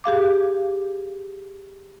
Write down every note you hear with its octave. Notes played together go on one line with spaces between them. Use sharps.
G4 G#4 F5 D6